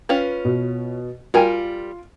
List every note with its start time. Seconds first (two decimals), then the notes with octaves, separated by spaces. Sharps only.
0.09 C#4 F4 B4
0.45 B2
1.34 G3 F4 A#4 G#5